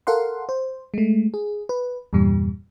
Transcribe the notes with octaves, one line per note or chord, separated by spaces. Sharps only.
A4 A#4 F5 F#5 C6
C5
G#3 A3
G#4
B4
E2 G2 A#2 G3